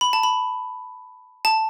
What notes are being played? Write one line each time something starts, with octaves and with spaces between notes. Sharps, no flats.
B5
A5
B5
A5